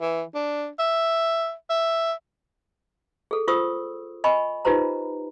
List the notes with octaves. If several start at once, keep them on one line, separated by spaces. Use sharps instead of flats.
E3
D4
E5
E5
G#4 A4
F4 C5 C#6 D#6 E6
D#5 G#5 B5 C#6
D#4 F4 G4 B4 C5 A#5